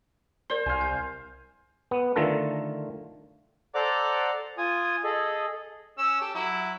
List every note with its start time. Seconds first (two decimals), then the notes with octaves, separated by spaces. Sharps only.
0.50 A#4 C5 D5 G7
0.66 C2 F5 G#5
0.81 G6
1.91 B3
2.16 D3 D#3 A3 F4 A4 A#4
3.74 A4 C5 D5 F#5 A#5 D6
4.58 F4 G#5 D#6
5.04 G#4 A4 D#5
5.98 C#4 E6
6.21 G4 A4
6.35 F#3 E4